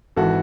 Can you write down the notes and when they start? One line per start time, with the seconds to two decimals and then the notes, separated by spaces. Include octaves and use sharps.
0.16 G#1 E3 F#4 A4